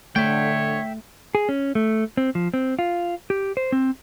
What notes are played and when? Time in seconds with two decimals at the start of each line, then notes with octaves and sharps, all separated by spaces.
0.16 D3 A3 C#5 E5 G5
1.35 G#4
1.49 C#4
1.75 A3
2.17 C4
2.35 F3
2.54 C4
2.79 F4
3.30 G4
3.57 C5
3.72 C4